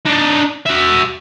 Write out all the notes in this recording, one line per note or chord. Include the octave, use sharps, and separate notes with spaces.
D4 D#4
F#4 E5